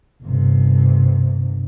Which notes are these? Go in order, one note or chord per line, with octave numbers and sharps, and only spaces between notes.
G1 C3